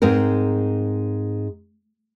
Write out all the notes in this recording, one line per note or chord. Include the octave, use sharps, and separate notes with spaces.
G#2 G#3 C4 A#4